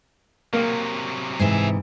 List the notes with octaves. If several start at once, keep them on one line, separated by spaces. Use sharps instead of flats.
C3 F#3 A#3
G#2 C3 E3 G#4 E5